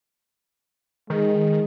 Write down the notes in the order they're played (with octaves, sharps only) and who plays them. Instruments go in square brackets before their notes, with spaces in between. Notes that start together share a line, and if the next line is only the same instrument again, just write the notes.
[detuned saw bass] D#3 [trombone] G#3